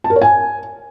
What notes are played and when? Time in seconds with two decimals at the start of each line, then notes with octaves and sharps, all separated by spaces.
0.04 A5
0.10 A#4
0.16 C#5
0.21 G#5